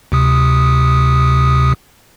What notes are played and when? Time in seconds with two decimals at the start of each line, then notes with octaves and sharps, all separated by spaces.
0.12 D2 C3 D#6